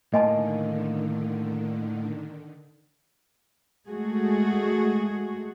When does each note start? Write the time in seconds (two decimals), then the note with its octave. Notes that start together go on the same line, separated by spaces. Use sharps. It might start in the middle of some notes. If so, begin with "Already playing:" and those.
0.14 A2 D3 D#3 A#3 D#5 G#5 A5
3.87 G#3 A3 F#4 G#4